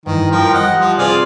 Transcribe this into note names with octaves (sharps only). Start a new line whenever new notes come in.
G2 D#3 E3
F3 A#4 G5
G3 G4 D#5 F#5
F3
C3 F4 G#4 C5 D5